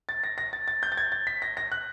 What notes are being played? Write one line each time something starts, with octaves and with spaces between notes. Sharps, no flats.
A6
A#6
A#6
A6
A6
G6
A6
G#6
A6
B6
A#6
A#6
F#6